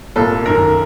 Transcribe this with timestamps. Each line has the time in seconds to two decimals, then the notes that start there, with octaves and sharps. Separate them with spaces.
0.16 C2 A#2 A4
0.46 F#2 D#3 A#4